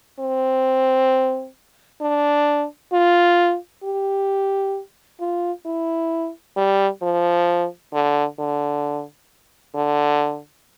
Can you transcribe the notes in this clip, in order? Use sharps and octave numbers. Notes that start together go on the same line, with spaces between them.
C4
D4
F4
G4
F4
E4
G3
F3
D3
D3
D3